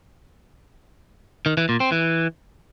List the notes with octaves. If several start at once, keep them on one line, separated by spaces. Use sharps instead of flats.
D#3
E3
A#2
C4
E3